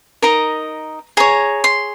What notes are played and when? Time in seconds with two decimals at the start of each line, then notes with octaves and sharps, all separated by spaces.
0.22 D#4 A#4 D#5 A#5
1.17 G#4 C#5 A#5
1.64 C6